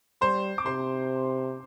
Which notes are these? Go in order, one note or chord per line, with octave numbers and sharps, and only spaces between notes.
G3 C5 C6
D6
C3 C5 C6